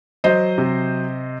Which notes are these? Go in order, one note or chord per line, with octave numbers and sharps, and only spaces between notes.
F#3 C5 D#5
C3